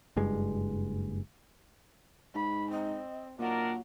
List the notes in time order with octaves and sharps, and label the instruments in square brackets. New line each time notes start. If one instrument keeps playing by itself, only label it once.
[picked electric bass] F#1 G2 G#3
[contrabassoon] G#2 [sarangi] B5
[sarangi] C4 [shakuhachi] D#5
[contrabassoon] A#2 [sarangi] F#3 [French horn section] D4 D#4 A#4 [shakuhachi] F#5